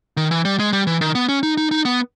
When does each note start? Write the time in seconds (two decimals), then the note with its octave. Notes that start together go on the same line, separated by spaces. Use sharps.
0.17 D#3
0.31 E3
0.45 G3
0.59 G#3
0.73 G3
0.87 E3
1.01 D#3
1.15 B3
1.29 C#4
1.43 D#4
1.57 D#4
1.71 D#4
1.85 B3